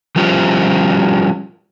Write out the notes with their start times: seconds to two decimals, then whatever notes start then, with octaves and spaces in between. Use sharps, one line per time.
0.16 F3 G3 C#4 F4 G4 C5